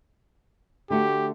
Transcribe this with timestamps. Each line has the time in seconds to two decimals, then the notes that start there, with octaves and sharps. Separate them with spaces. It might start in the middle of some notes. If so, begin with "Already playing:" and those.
0.90 D3 A3 F#4 G4